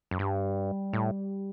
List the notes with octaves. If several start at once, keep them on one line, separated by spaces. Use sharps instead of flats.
F#2
G2 G3
A2